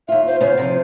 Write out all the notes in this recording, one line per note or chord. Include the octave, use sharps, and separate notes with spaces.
D#2 F4 E5
C5
C#3 B3 C#4 C5
C3 E3 F3